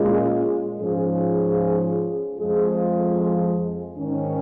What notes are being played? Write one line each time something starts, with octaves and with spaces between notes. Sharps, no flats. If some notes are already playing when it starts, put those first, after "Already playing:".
Already playing: A#2 G#3 C#4 F4 G#4
G#2 F3 C#4 F4 G#4
F2 F3 G#3 F4 G#4
G#2 D#3 C#4